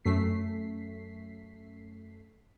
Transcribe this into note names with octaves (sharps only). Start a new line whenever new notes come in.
F#2 A3 B6 C7